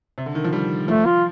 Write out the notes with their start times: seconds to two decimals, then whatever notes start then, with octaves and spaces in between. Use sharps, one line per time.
0.18 C3
0.26 D3
0.35 D#3
0.44 F3
0.53 G3
0.88 F3 A3
1.06 F4